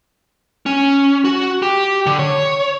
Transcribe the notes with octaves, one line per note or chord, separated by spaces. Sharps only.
C#4
F#4
G4
D3
C#5